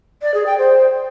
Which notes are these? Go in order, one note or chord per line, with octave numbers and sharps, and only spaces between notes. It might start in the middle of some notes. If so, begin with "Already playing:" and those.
D5
G#4
G5
C5